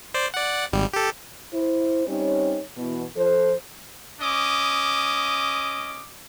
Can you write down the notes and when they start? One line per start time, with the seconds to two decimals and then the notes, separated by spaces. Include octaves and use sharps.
0.14 C5 D5
0.34 D5 F#5
0.73 G#1 G3
0.94 G4 A4
1.53 E4 C5
2.08 G3 C4 C#4 D#4 C#5
2.77 B2 E3
3.16 F3 A4 C5
4.21 C#4 D#5 D6 D#6